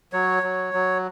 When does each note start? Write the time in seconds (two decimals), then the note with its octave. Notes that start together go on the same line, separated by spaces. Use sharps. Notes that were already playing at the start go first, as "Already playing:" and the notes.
0.13 F#3 C#5
0.43 F#3
0.74 F#3